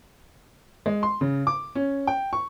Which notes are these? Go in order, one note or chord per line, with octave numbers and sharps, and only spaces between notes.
G#3
C6
C#3
D6
C#4
G5
C#6